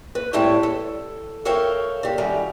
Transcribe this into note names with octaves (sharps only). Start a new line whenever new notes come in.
B4
A2 G3 C4 E4 C#5 A5
A4
A4 A#4 C#5 E5 F5 G5
D3 G4
F#2 D#3 G3 E4 A#5